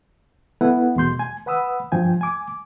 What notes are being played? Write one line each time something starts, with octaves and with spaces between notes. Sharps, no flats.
B3 E4 A4 B4 F#5
E2 B2 C6 G6
G#5
B4 F#5 B5 D#6 E6
G2 F3 G5 G#5
G#5 D6